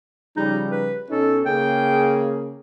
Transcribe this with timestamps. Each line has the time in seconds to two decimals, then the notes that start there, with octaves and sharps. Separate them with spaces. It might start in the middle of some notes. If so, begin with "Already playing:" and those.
0.36 C#3 F3 G3 D#4
0.72 B4
1.10 B2 C#4 D#4 A4
1.45 C#3 A#3 G#4 G5